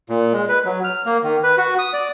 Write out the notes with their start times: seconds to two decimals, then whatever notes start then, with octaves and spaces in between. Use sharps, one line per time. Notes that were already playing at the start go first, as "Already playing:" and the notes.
0.09 A#2
0.33 G#3
0.49 B4
0.65 F#3
0.84 F6
1.06 A#3
1.24 D#3
1.43 B4
1.58 F#4
1.79 D#6
1.93 D5